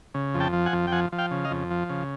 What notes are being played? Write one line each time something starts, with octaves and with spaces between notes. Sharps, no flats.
C#3
F2
G5 A5
F3
F#5 G#5
F2
G5
F3 F#5 G#5
F3
F5 G5
C#3
D#5 F5
F2
F3
C#3